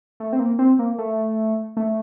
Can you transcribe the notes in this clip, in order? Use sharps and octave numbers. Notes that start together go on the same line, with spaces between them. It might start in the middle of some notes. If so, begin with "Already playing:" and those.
A3
C4
A#3
C4
A#3
A3
A3